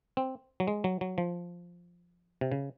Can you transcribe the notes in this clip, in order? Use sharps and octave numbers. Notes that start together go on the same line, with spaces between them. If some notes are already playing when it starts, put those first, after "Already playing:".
C4
F#3
G#3
F#3
F#3
F3
C3
C#3